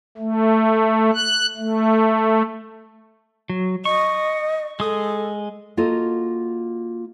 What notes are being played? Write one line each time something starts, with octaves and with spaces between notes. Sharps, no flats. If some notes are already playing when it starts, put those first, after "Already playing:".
A3
F#6
A3
F#3
D#5 C#6
G#3 A4 D#6
A#3 F4 F#4 A4 D#5